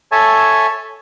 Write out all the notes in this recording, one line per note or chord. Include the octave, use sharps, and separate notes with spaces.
A4 C#5 E5 G#5 A5